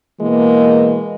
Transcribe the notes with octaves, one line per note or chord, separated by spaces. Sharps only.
B2 E3 G#3 A#3